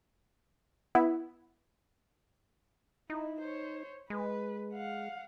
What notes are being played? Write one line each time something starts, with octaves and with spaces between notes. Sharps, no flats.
B3 E4
D#4 E4
C5 C#5
G#3 B4
F5 F#5